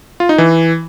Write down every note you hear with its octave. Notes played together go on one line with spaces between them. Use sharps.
F4
D#4
E3